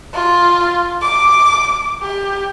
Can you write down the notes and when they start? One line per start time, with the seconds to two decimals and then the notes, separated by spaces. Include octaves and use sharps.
0.13 F4
1.01 D6
2.02 G4